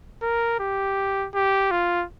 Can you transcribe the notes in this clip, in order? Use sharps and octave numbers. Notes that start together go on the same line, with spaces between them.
A#4
G4
G4
F4